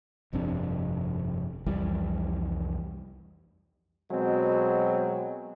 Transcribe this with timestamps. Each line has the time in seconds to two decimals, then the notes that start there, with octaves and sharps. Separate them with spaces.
0.33 G1 F2 C3 D4
1.66 C2 F2 E3 G3
4.11 B2 F#3 G#3 C4